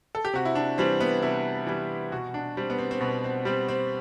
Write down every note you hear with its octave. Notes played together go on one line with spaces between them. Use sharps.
A4
G4
C3 F#4
E4
D4
E3 G3 C4
B3
C3 E4
E3 G3
B2 F#4
D4
G3 C4
B3
C4
C4
B2 B3
C4
G3 C4
C4